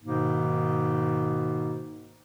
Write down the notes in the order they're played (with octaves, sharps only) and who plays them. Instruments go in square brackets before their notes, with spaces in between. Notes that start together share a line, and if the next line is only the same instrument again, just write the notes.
[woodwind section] G#2 B2 D#3 A#3 D#4